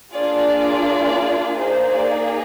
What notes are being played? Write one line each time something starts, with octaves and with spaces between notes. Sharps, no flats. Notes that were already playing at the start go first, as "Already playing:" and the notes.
A#3 D4 F4 G#4 D5
A#3 D#4 G#4 C5
D5